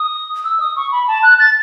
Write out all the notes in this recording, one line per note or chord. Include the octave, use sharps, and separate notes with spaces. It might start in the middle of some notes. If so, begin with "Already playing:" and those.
Already playing: D#6
E6
D#6
C#6
B5
A5
F#6
A6